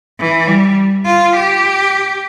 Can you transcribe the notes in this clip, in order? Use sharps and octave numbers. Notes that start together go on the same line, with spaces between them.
E3
G3
F4
G4